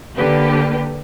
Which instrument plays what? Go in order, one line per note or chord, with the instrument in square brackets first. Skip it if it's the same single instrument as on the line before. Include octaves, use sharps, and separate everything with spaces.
[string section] D3 A#3 G4 B4